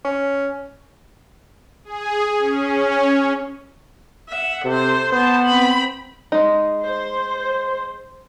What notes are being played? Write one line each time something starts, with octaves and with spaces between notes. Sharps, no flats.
C#4
G#4
C#4
E5 F#5
C3 A4 C5
B3 C5 A5
C4 B5
G#3 D#4
C5